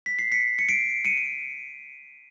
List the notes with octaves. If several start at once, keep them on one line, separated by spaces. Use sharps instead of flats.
B6
C7
B6 C#7
C#7
C7 D7
C#7 D#7
C#7